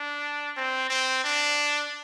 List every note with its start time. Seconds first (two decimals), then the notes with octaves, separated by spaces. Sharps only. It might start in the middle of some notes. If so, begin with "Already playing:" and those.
Already playing: D4
0.57 C4
0.90 C4
1.24 D4